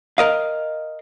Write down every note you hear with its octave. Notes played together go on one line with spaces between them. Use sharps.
A#4 D#5 F5